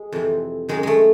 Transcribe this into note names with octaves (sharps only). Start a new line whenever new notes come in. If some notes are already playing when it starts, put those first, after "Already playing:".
Already playing: G#3
F2 C3 E3
F#2 D#3 G#3
G#3 A3